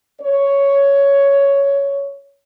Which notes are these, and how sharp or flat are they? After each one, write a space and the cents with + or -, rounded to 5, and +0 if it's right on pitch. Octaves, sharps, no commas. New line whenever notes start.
C#5 +10